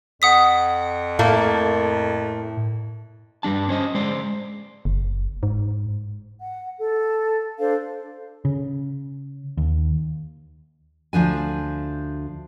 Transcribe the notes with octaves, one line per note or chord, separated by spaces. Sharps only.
F2 F#5 D#6 B6
A2 A3 A#3 A#4
G2 G3 D4 A5
C#4 C5 D#5
G#3 C5 D5
F#1
G#2
F#5
A4
D4 A4 C5 F5
C#3
D#2
D2 F3 D4 G#5